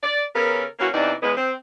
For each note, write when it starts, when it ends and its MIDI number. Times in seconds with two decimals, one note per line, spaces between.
0.03 0.24 74
0.34 0.64 49
0.34 0.64 59
0.34 0.64 61
0.34 0.64 69
0.34 0.64 70
0.79 0.87 52
0.79 0.87 58
0.79 0.87 61
0.79 0.87 66
0.93 1.12 40
0.93 1.12 48
0.93 1.12 52
0.93 1.12 62
0.93 1.12 63
0.93 1.12 74
1.22 1.34 40
1.22 1.34 56
1.22 1.34 71
1.36 1.52 60